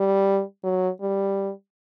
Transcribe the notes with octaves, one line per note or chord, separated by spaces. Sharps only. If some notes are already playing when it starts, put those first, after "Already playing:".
Already playing: G3
F#3
G3